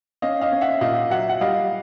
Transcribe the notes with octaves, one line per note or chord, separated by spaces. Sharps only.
C#4 D#5 F5
D#5 F5
C#4
E5 F#5
A#2 D#5 F5
F#3 E5 F#5
F#5
G3 D#5 F5